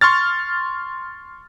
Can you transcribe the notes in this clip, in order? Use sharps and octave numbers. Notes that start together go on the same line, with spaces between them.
C6 C#6 F6 A6